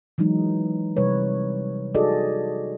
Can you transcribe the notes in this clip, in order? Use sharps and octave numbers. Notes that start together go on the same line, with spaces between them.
E3 F#3 G#3 D#4
C3 G3 B4 C#5
D#4 F#4 G#4 A4 D5 D#5